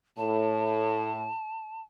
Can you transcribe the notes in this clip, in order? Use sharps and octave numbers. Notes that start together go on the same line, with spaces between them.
A2 A5